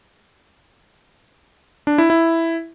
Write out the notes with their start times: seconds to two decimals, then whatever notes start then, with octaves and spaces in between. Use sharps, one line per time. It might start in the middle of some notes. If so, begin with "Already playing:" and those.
1.87 D4
1.98 E4
2.10 E4